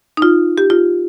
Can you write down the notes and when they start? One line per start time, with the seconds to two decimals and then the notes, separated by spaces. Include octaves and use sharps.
0.17 D#4
0.22 F4
0.58 G4
0.70 F4